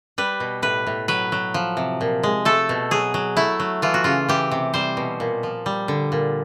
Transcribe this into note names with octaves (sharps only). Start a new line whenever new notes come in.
G3 B4
B2
A2 B4
A2
F#3 B4
F#3
F3
C3
A#2
G#3
A3 A4
B2
F#3 G#4
F#3
A3 E4
F#3
E3 F4
F#4
C#3 F4
E3 G4
C3
G3 C5
B2
A#2
F3
G3
D3
A#2